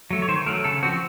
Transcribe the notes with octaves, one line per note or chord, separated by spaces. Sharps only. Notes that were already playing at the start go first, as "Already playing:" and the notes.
F#3 A3
C#5
D#3 C5
F#3 A3 A#4
C#3 A4
F3 C4 F#4